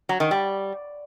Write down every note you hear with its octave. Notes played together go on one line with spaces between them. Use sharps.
F#3
D#3
G3